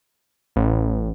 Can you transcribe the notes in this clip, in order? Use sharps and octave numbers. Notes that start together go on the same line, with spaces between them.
A1